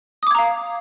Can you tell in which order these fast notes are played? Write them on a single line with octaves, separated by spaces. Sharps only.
D#6 D6 G#6 A#5 F5